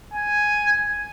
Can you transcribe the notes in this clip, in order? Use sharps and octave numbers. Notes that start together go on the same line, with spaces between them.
G#5